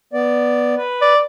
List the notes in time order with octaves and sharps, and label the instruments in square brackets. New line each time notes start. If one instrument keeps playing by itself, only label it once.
[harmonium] B3 D5
B4
[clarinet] D5